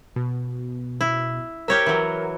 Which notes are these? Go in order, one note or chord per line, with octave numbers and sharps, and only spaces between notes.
B2
E4
G4 A#4 C#5 E5
E3 F#3